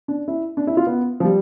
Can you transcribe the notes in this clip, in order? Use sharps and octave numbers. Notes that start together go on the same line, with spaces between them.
D4
E4
D4
E4
F4
B3
F3
G3